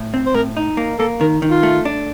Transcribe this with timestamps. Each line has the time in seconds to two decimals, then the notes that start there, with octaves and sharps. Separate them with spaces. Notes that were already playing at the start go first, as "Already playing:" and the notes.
Already playing: A2
0.14 C4
0.26 C5
0.34 A2 A#4
0.57 D#4
0.77 A#3
0.99 A#3 A4
1.21 D#3 A#4
1.42 D#3
1.50 F4
1.63 A3
1.85 D4